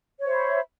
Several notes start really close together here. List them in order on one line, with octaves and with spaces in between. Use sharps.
C#5 C5 E5 B5